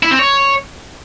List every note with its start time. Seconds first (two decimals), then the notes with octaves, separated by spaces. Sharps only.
0.03 E4
0.11 C4
0.19 C#5